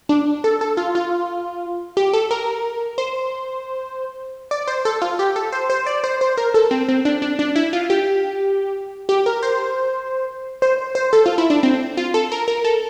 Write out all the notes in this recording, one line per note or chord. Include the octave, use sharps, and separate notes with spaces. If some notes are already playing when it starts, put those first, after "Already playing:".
D4
A4
A4
F4
F4
G4
A4
A#4
C5
D5
C5
A4
F4
G4
A4
C5
C5
D5
C5
C5
A#4
A4
C4
C4
D4
D4
D4
E4
F4
G4
G4
A#4
C5
C5
C5
A4
F4
E4
D4
C4
F4
A4
A#4
A#4
A4